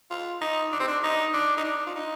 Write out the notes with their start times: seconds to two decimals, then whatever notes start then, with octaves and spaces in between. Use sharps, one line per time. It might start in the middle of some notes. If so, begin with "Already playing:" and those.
0.11 F4
0.41 D#4
0.72 D4
0.80 C4
0.87 D4
1.03 D#4
1.34 D4
1.57 D#4
1.64 D4
1.86 F4
1.95 D#4